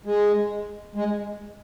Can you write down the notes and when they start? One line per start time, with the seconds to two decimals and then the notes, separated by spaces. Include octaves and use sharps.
0.05 G#3
0.95 G#3